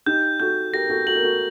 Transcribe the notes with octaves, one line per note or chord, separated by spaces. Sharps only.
D#4 G4 G6
F#4 A4 G6
G4 A#4 A#6
F#4 A4
F#4 A4 F#7
A#4
F#4 A4